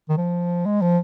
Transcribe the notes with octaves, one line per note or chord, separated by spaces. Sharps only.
D#3
F3
G#3
F3